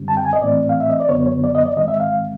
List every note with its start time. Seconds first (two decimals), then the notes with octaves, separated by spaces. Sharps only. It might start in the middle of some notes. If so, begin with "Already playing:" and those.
Already playing: F#2 D3 G3 C4
0.08 A5
0.17 G5
0.25 G#5
0.33 D#5
0.41 A2 E3 A3 C4 D5
0.69 F5
0.80 E5
0.90 D#5
1.00 D5
1.09 F#2 D3 F#3 B3 C#5
1.26 C#5
1.44 D5
1.55 D#5
1.66 D5
1.77 G#2 D#3 G#3 C4 D#5
1.88 E5
2.00 F5